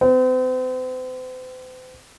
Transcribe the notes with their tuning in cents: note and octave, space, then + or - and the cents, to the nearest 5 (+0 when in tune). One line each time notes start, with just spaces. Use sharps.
C4 -40